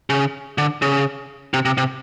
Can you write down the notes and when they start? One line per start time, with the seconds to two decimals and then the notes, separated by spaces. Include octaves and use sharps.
0.10 C#3
0.58 D3
0.82 C#3
1.54 C3
1.65 C3
1.78 C3